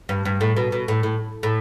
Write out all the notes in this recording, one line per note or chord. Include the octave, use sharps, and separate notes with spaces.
G2
G2
A2
B2
B2
A2
A2
A2